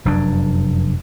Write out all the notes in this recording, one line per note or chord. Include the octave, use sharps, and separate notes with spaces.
F1 F#2 F#3 D4